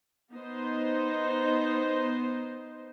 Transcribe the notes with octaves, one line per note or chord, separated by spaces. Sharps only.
B3 D#4 C5